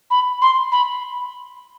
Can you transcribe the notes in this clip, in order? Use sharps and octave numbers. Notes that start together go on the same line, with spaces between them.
B5
C6
B5